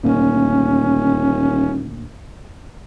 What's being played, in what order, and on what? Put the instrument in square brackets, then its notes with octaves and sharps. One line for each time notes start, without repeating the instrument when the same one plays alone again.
[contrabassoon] D#1 [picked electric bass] D2 A#2 A#3 [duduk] C#4